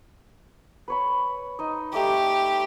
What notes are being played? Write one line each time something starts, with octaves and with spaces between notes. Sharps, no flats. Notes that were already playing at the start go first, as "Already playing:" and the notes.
B4 C#5 B5
D#4 D#5
G3 A3 D#4 G4